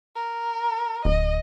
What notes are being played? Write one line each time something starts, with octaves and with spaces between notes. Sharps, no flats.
A#4
D1 D#5